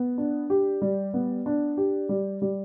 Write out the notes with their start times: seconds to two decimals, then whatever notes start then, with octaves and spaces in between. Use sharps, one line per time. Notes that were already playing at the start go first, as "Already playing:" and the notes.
Already playing: B3
0.18 D4
0.50 G4
0.82 G3
1.14 B3
1.46 D4
1.77 G4
2.09 G3
2.42 G3